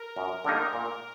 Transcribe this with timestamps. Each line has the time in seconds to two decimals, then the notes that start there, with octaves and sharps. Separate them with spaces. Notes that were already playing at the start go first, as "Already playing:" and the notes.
Already playing: A#4
0.16 F#2
0.44 D3 G3 A#3 D#4
0.73 A#2